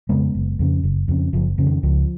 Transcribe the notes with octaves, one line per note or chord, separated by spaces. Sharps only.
F2 C#3 G#3 B3
F#1
F2 C#3
F#1
F2 C#3
F#1 F3
F2 C#3
D#3
C#2 F3